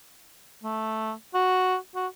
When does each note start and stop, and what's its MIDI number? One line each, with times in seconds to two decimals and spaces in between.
0.63 1.13 57
1.34 1.77 66
1.95 2.07 66